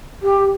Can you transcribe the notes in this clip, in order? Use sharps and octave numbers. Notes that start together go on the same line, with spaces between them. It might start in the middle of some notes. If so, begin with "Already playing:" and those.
G4